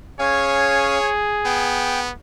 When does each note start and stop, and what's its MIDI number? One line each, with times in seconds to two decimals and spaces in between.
0.20 0.98 61
0.20 2.12 68
0.20 1.11 73
0.20 0.98 77
0.20 0.98 80
1.46 2.12 59
1.46 2.00 79